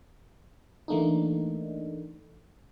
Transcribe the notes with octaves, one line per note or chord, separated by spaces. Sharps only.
E3 A3 A#3 D4 D#4